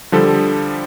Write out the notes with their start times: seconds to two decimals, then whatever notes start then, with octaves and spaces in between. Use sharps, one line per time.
0.12 D3 F3 G3 A4